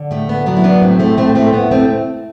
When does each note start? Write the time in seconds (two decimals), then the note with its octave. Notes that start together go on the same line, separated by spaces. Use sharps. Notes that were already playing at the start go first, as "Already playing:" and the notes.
Already playing: D3
0.11 A2 A3
0.29 B3
0.46 F#3 B3 D4
0.57 E4
0.64 B3 D4
0.82 A2 A3 C4
1.00 A3 C4
1.17 A2 A3 C4
1.35 A3 C4
1.53 A2 B3
1.71 A3 C4